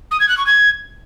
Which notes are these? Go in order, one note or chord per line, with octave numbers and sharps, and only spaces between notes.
D#6
G#6
F#6
C#6
G#6